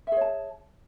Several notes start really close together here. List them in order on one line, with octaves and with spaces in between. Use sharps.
E5 G#4 C#5 A5